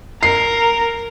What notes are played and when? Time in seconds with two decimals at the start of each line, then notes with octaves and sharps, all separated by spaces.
0.23 A#4 C7